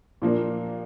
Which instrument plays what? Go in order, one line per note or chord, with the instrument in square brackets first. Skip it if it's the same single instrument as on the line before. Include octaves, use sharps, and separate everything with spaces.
[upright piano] A#2 F3 A#3 D4